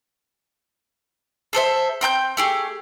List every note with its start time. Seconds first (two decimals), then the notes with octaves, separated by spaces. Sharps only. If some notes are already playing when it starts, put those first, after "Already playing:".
1.53 G#4 A4 C5 E5
2.01 C4 G5 A#5 G6
2.37 A3 G4 G#4